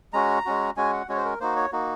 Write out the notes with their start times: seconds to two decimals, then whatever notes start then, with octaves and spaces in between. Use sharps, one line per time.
0.13 G#3 C#4 F#4 A#5
0.45 G#3 C#4 F#4
0.77 G#3 C#4 F#4 G#5
0.93 F#5
1.09 G#3 C#4 F#4 C#5
1.17 C5
1.25 A#4
1.40 A#3 D#4 F#4 C5
1.56 C#5
1.72 A#3 D#4 F#4